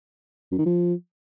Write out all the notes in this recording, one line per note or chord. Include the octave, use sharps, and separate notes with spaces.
F#2
D#3
F3